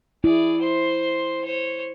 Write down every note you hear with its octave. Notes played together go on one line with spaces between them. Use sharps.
E4 G#4 D5
C5 C6
C5 C#5